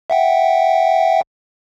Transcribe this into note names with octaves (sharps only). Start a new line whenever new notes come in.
E5 F#5 G5